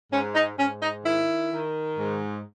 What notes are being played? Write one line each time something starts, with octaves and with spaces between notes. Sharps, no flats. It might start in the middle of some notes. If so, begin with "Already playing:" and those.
G#2 C#4
D#4
G#2 C#4
D#4
D#3 E4
D#3
G#2